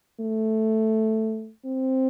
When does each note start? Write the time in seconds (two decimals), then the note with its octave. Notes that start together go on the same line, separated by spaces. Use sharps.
0.20 A3
1.65 C4